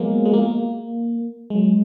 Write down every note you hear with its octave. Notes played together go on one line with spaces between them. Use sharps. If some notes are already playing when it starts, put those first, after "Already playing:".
Already playing: F3 F#3 G#3 A#3 B3
G#3
A#3
G#3
F#3